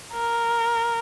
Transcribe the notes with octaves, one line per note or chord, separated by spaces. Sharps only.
A#4